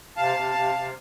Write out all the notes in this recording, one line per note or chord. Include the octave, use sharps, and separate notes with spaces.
C3 F5 A5
C3
C3
C3